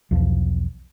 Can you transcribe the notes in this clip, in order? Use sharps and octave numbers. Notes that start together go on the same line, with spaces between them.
B1 E2 F3